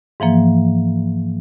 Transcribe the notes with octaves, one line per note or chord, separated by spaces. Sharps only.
G#2 E3 F3 A#3